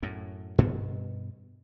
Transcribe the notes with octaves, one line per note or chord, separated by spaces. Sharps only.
F#2 A2
G2 B2 B3